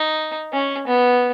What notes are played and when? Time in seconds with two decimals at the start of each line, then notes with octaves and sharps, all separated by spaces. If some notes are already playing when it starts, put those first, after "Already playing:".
Already playing: D#4
0.53 C#4
0.87 B3